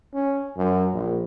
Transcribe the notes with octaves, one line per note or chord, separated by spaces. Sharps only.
C#4
F#2
A#1